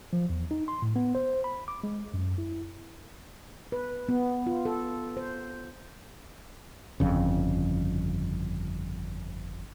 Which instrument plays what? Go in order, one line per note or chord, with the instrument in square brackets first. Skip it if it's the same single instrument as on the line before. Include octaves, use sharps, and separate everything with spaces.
[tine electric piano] F3
E2
D#4
C6
A2
B3
C5
B5
D6
G#3
F#2
E4
[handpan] B4
B3
F4
A4
C5
[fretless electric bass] G1 F2 C#3